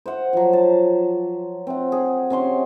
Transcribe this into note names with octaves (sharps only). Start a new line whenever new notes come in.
C5 F#5
F3 F#3
A5
C4 F#5
G#4
C3 C#4 C6 C#6